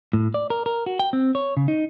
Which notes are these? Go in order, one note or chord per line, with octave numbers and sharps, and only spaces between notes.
A2
D5
A#4
A#4
F#4
G5
C4
C#5
C#3
D#4